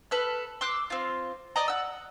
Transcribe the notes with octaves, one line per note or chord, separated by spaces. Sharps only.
A4 B4 F6
C6 D6 E6 F#6
C4 F4
D5 D#5 A#5
F#5 E6